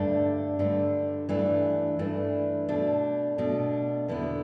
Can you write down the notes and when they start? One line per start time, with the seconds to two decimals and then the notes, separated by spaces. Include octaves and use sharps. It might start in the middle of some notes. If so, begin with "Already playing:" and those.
Already playing: G2 D3 A3 D4
0.59 G2 D3 A3 D4
1.29 G2 E3 A3 D4
1.99 G2 E3 A3 D4
2.69 B2 A3 D4
3.38 B2 A3 D4
4.08 E2 D3 B3 E4